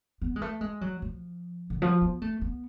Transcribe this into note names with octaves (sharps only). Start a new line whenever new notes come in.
B3
G#3
A3
G#3
F#3
F3
D3
F3
B3
A3
B3